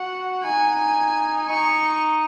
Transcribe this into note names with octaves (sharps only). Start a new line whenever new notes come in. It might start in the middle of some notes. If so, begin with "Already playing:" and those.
Already playing: F#4 F#5
D#4 G#5
D#4 C#6